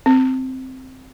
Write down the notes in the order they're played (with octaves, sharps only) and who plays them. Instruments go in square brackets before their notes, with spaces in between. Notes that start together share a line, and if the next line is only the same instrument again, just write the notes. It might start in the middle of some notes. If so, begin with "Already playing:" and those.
[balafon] C4